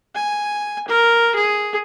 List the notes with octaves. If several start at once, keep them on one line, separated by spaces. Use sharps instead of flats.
G#5
A#4
G#4